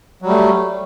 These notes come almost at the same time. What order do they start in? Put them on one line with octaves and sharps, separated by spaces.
F#3 G3 A3